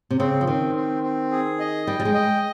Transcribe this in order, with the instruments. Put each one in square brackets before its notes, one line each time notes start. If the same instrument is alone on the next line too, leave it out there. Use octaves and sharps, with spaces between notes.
[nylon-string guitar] C3
[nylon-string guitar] C#3 [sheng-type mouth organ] C4
[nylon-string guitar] F3
[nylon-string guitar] D#3 [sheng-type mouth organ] C4
[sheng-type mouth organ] C4
C4
G#4
D#5
[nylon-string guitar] G3 [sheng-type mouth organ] G5
[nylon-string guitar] G3
G#3
[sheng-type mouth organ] D#5